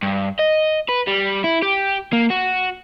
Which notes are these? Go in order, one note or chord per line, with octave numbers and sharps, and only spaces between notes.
G2
D#5
B4
G3
E4
G4
A#3
F#4